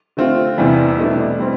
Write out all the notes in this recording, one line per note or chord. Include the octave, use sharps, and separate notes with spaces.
D3 A3 C4 F4
E2 C3 E3 G3
B2 A3 D4
B2 G3 C4